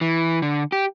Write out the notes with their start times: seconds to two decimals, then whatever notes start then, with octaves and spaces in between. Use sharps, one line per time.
0.01 E3
0.42 D3
0.72 G4